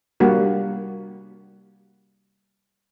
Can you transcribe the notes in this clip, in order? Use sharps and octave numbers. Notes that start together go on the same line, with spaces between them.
G3 A#3 D4 F#4